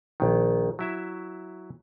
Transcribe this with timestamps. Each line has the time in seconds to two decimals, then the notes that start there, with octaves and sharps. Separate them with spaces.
0.20 A#1 D#3
0.79 F#3 E4 E5